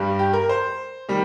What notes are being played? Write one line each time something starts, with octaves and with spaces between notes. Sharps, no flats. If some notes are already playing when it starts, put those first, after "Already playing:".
Already playing: G2 G3
G4
A#4
C5
D#3 G3